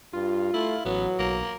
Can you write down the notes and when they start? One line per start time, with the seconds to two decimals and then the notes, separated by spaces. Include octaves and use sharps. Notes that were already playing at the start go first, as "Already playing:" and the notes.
0.13 G2 F4
0.54 A3 E4
0.85 A1 F#3 B3
1.19 B1 A#3